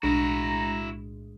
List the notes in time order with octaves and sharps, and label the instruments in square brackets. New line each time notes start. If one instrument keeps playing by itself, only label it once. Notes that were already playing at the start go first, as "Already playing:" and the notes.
[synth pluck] B1 A2 G#3 [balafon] D4 [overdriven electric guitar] E4 F#4 [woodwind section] A#5